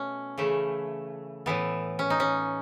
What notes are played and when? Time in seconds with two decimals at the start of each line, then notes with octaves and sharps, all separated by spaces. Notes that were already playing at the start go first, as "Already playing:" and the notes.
Already playing: B2 A3 C#4
0.38 C#3 E3 A3
1.46 A2 E3 B3
1.99 C#4
2.10 D#4
2.20 C#4